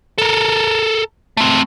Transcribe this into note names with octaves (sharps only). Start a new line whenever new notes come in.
A4 A#4
A3 C4